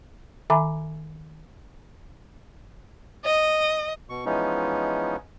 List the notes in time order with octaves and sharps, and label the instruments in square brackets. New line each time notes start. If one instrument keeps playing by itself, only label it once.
[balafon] D#3 E5 G#5 A#5 B5 D6
[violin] D#5
[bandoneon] B2 C#6
E3 F3 G#3 B3 C#4 D#4